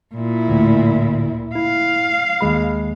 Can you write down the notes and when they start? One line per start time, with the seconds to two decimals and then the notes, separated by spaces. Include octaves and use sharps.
0.15 A#2 E4
0.49 D2 A2
1.55 E4 F5
2.41 D#2 G#3 B5